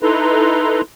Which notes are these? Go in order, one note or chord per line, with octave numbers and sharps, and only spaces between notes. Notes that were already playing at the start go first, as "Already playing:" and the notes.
D#4 E4 A4 B4 A#5 C6